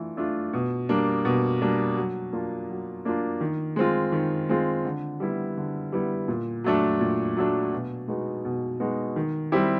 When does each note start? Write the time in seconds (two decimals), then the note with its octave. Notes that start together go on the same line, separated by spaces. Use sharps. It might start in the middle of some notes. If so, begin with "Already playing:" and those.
Already playing: E3 A3 D4 F4
0.17 A3 D4 F4
0.53 B2
0.89 G3 A#3 D4
1.25 B2
1.61 G3 A#3 D4
1.96 F#3
2.33 A#3 D4 F4
2.69 F#3
3.05 A#3 D4 F4
3.41 D#3
3.76 G#3 C4 F4
4.12 D#3
4.49 G#3 C4 F4
4.85 D3
5.20 G3 B3 E4
5.57 D3
5.92 G3 B3 E4
6.28 A#2
6.64 F#3 A3 D4
7.00 A#2
7.37 F#3 A3 D4
7.73 B2
8.08 G#3 B3 D#4 F#4
8.45 B2
8.80 G#3 B3 D#4 F#4
9.16 D#3
9.52 G3 C4 E4 G4